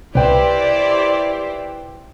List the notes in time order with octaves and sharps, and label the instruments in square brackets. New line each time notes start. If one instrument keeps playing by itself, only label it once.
[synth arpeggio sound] C2 C3 [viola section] E4 G4 C5 [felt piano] B4 G5 [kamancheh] D5